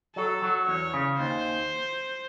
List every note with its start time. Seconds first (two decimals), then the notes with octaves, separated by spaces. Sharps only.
0.16 F#3 A4
0.42 F#3
0.67 E2 C#5
0.94 C#3
1.18 D#2 C5